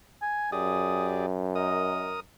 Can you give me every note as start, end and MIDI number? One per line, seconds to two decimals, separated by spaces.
0.22 0.52 80
0.52 2.22 42
0.52 1.26 67
0.52 1.26 68
0.52 1.26 74
0.52 1.17 87
1.56 2.20 70
1.56 2.11 75
1.56 2.20 87